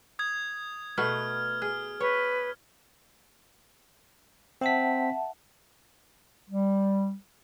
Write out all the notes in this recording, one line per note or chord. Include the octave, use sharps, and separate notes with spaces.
D#6 G#6
B2 A3 B3 F6
G#4 F6
B4 C#5
C4 E5 F#5 A5 B6
G3